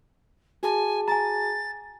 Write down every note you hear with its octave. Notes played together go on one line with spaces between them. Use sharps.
F#4 G#4 G#5 A5
G#5 A#5 A6